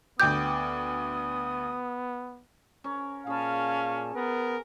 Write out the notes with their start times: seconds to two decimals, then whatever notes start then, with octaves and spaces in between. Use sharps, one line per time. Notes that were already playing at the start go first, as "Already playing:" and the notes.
0.20 D2 B3 G5 D6 D#6 G6
2.84 C#4 A#4
3.27 A#2 C#4 G#4 F5 A5 B5
4.15 B3 A#4